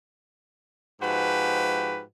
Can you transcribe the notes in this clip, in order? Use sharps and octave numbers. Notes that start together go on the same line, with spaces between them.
G#2 F3 G#3 F#4 G4 B4